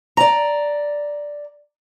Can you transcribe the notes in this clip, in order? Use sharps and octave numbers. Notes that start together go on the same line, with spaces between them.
D5 A#5